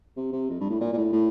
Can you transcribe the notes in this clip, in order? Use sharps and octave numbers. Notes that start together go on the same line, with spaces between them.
C3
C3
F2
G2
A2
A#2
A#2
A2
A2